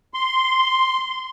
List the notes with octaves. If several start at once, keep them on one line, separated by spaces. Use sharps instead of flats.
C6